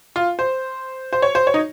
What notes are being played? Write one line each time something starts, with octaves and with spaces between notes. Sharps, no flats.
F4
C5
C5
C#5
C5
C#5
D#4